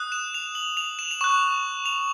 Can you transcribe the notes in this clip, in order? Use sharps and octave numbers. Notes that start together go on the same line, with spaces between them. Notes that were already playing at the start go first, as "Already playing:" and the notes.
Already playing: D#6 F#6
E7
F7
F#7
F7
E7
F7
C#6 F#6 E7
F7